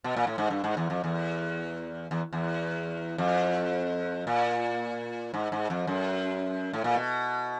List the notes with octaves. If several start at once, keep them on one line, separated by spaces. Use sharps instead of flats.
B2
A#2
A2
G#2
G2
G#2
E2
F2
E2
E2
E2
F2
A#2
G#2
G#2
F2
F#2
A2
A#2
B2